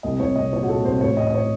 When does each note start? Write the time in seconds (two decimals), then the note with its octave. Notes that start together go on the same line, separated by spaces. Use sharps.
0.03 C2 D#5
0.20 C2 C#5
0.36 C2 D#5
0.52 A#2 C#5
0.63 F#4
0.69 A#2 A4
0.84 C2 C5
1.01 A1 C#5
1.17 A2 D#5
1.27 D#5
1.34 C#5